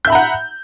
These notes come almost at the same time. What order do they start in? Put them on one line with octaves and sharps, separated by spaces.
G6 E5 B5 A#5 F#5